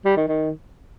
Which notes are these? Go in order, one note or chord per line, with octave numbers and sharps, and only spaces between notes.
G3
D#3
D#3